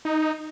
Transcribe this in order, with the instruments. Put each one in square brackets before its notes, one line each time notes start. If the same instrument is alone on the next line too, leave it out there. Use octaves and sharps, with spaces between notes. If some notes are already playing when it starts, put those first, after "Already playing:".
[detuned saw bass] D#4